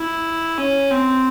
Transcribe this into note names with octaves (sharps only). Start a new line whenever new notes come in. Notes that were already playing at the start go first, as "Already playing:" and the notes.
Already playing: E4
C#4
C4